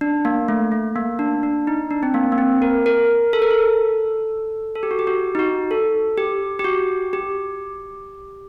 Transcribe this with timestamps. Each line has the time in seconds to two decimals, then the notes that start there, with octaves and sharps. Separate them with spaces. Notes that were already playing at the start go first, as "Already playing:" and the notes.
0.01 D4
0.25 A#3
0.48 A3
0.72 A3
0.96 A#3
1.19 D4
1.43 D4
1.67 D#4
1.91 D4
2.03 C4
2.14 A#3
2.32 A#3
2.38 C4
2.62 A#4
2.86 A#4
3.33 A4
3.42 A#4
3.51 A4
4.75 A4
4.83 G4
4.91 F#4
4.99 G4
5.07 F#4
5.35 D#4
5.39 F#4
5.71 A4
6.18 G4
6.59 G4
6.64 F#4
7.13 G4